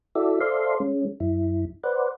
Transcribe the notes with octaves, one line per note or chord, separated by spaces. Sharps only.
E4 F#4 A4 D5 E5
A4 C5 D5 E5 F5 C6
G#3 C#4
F#2 E4
B4 C5 D5 F#5